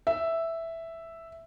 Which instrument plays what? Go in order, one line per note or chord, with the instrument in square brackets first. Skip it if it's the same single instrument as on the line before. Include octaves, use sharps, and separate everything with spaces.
[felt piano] E5